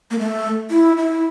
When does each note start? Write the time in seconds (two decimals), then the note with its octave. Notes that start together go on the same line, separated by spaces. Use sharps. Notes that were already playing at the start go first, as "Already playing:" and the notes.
0.11 A#3
0.19 A3
0.71 E4
0.97 E4